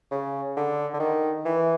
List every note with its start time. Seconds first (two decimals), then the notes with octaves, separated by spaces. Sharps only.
0.11 C#3
0.56 D3
0.94 D3
1.00 D#3
1.45 E3